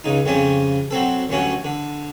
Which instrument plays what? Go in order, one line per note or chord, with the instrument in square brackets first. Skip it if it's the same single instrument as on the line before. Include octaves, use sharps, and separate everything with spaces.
[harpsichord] C#2 C#3 D#4
F2 C#3 G3 C#4
F#3 C4 A4
D2 G2 F#3 C#4
D3